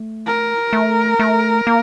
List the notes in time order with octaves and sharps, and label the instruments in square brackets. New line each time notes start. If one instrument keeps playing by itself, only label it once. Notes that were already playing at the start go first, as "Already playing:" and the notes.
Already playing: [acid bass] A3
[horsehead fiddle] A#4
[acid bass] A3
A3
A#3